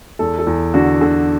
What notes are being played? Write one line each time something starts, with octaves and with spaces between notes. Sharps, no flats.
E2 A4
A4
E2
D3 F#4
D3